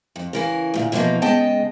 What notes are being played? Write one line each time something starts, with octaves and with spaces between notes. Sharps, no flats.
F2
C#3 E3 A#4
D2 A#2
B2 E3 F3 A#3 D#4
C#3 G#3 B3 D#5 G5 A5